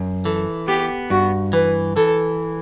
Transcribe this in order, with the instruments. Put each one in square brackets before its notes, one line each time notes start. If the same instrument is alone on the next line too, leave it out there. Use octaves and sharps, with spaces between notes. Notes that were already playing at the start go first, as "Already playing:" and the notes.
Already playing: [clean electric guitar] F#2
[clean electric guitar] E3 [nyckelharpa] A4
[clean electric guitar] B3 [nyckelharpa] G4
[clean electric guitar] G2 [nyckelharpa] F#4
[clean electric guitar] E3 [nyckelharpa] B4
[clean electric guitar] E3 [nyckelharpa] A4